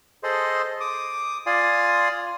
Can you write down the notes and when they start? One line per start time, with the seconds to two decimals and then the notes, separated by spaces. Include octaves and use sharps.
0.23 G#4 A4 C5 D#5 C6
0.81 D6 D#6
1.47 F4 D5 F5 G#5 C6 D#6